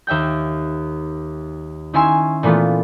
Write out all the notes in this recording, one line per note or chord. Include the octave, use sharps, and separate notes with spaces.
D#2 E5 G5 G6
D#3 C#4 E4 G#5 C6 E6
A#2 E3 A3 B3 F4